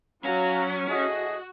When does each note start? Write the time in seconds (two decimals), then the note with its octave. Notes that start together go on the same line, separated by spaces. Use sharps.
0.24 F#3 C#4 F#4 F5 A#5
0.89 A2 F#4 G#4 D#5